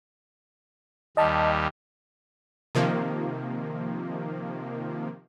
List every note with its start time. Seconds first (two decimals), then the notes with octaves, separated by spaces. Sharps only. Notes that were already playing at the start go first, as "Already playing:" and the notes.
1.17 D#2 G3 D#5 A5
2.75 C3 D#3 F3 A#3